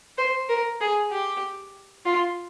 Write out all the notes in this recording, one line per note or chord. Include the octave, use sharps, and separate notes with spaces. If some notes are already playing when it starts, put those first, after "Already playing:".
C5
A#4
G#4
G4
F4